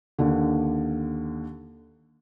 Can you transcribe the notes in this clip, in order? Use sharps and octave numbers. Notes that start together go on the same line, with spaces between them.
D#2 D3